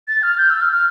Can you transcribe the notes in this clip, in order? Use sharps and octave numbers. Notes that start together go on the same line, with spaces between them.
A6
F6
G6
E6
F6
F6